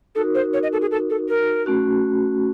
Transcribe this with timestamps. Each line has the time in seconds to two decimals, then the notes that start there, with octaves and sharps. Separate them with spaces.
0.15 D#4 F#4 A4 A#4
0.35 C5
0.53 C#5
0.63 D#5
0.72 A4
0.81 G#4
0.91 A4
1.10 A4
1.29 A#4
1.66 A3 C#4 F#4